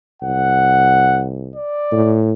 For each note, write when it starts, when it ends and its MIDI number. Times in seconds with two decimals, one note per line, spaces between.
0.22 1.56 36
0.22 1.26 78
1.56 2.18 74
1.92 2.33 45